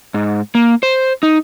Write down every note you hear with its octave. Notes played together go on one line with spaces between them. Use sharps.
G#2
A#3
C5
D#4